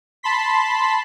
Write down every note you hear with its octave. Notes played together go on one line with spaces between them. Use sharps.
A5 B5 C6 B6